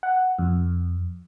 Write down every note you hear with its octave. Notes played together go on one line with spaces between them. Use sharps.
F#5
F2